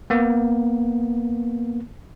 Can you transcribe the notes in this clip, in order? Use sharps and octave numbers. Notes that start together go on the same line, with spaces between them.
A#3 B3